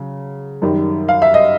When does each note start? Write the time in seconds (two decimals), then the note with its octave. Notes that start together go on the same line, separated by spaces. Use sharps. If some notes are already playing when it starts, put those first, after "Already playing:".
Already playing: C#3 F#3
0.62 F#2 D#3 G3
1.09 F5
1.22 E5
1.34 D#5